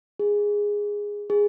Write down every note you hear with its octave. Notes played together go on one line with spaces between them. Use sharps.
G#4
G#4